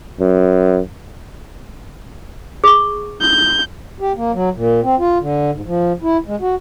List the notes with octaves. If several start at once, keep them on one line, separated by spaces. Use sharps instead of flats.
F#2
G#4 C#6
G6
G4
A#3
F#3
A#2
C4
F4
D3
G#2
F3
E4
G#3
F#4